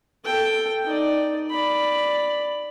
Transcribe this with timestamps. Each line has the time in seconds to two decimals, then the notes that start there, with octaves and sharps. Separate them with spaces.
0.24 A4 G5
0.85 D#4 D5
1.50 D5 B5